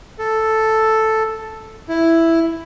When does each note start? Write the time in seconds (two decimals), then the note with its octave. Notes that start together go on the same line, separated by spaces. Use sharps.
0.19 A4
1.89 E4